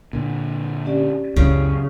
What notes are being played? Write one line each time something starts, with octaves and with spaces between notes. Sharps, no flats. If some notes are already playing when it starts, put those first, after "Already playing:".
A#2 D3
C#4 G4 D5
C#2 F#2 C#3 E4